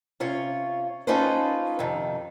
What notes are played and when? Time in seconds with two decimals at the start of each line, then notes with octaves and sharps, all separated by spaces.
0.20 C3 C#4 F4 C#5
1.07 C#4 D#4 F4 A4 B4 C5
1.79 F2 C3 D#3